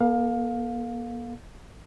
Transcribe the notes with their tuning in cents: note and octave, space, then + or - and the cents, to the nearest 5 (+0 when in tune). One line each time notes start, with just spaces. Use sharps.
A#3 +45 A4 +0 F5 +20